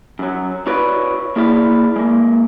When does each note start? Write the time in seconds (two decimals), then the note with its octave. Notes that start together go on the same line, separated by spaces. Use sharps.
0.19 F#2 F#3
0.66 E4 F#4 B4 C#5 D5
1.36 A#3 E4 G#4 D5 E5 F5
1.96 G#3 A#3